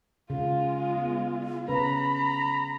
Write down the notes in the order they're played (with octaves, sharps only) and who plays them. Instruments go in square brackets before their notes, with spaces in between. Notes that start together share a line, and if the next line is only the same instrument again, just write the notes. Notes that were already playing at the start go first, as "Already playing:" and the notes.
[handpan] C#3 [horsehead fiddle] G#3 F4
[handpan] B3
[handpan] C#3 C#4 B4 [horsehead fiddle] A#5 [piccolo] B5
[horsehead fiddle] A#5